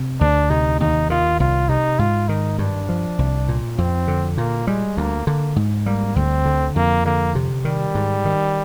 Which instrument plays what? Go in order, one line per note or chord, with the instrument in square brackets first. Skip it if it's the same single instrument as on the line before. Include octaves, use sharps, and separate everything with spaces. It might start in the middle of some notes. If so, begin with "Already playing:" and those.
Already playing: [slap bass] C3
[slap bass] D2 [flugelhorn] D4
[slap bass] C3 [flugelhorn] D#4
[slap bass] D#2 [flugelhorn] D#4
[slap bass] D#3 [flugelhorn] F4
[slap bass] C2 [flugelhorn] F4
[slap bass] C3 [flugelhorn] D#4
[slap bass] G#2 [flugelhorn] F4
[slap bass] D#3 [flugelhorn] D#4
[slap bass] G2 [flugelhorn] D4
[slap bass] F3
C2
A#2
[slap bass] F2 [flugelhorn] C4
[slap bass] D3
[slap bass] A#2 [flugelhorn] A#3
[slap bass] G3 [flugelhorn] G#3
[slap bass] D2 [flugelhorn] A#3
[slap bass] D3 [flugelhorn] A#3
[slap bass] G#2
[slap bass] G3 [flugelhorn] A#3
[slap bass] D2 [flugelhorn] C4
[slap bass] D3
[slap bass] F2 [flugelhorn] A#3
[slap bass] D3 [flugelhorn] A#3
[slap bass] C3
[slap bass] D#3 [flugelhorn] G3
[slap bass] G#2
D#3